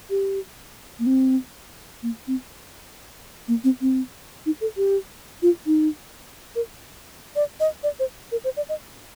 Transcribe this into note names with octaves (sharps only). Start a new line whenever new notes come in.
G4
A#3
C4
A#3
C4
A#3
C4
C4
D#4
A4
G4
F4
D#4
A#4
D5
D#5
D5
C5
A#4
C5
D5
D#5